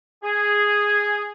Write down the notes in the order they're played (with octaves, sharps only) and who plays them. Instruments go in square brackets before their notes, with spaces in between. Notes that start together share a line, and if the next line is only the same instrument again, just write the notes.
[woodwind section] G#4